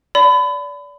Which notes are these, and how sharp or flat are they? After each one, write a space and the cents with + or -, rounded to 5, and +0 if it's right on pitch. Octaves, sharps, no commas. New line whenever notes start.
D5 -30 B5 +30